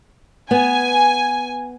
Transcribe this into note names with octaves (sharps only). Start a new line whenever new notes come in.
B3 G#5